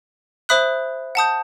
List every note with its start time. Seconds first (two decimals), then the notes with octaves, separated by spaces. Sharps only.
0.49 C5 E5 B5 D#6 F#6
1.15 F#5 A5 D#6 G6